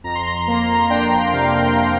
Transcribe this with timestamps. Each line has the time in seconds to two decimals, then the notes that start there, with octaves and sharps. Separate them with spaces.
0.04 F2 A#5
0.15 C6
0.27 A#5
0.40 C6
0.48 A#3 A#5
0.63 C6
0.74 A#5
0.90 D4 G5
1.34 C3 F5